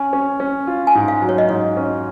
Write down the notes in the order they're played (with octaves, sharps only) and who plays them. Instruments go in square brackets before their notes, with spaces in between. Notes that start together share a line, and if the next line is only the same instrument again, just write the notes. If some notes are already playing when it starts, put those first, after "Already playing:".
Already playing: [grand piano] C#4 [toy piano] G#5
[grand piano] C#4
C#4
F4
[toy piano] G#5
[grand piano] G#2
[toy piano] F5
[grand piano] F#3
[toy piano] C#5
D#5
[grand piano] G#2 [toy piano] C#5
[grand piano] C#4